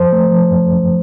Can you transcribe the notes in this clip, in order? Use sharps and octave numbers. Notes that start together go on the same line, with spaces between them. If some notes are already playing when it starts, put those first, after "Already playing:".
Already playing: F#2 F3 C5
A3
F3
F#2
F#2